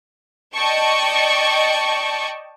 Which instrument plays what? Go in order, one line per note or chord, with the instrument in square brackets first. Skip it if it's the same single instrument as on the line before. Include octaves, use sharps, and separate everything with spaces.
[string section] D5 D#5 G5 A5 C#6